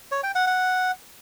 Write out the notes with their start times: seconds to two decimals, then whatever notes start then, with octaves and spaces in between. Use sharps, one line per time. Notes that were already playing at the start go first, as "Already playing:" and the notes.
0.12 C#5
0.23 G5
0.35 F#5
0.47 F#5